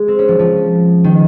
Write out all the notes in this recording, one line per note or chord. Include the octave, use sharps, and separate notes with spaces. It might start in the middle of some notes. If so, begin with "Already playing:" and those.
Already playing: G#3
C4
C#4
F3
F3
D#3